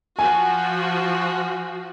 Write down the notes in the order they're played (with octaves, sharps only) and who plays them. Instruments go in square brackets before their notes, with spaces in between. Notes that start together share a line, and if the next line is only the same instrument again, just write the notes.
[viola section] F3 F#4 [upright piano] G#5